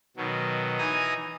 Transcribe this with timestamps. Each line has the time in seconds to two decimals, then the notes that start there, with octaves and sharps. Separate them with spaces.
0.17 B2 D#3 F#3
0.78 E3 D#4 G#5 A#5 D#6